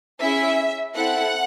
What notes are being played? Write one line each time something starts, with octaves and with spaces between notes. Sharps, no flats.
C#4 E4 G#4 E5
C4 E4 A4 F#5